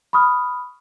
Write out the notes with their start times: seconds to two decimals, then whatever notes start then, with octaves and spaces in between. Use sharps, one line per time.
0.13 B5 C#6 D#6 F6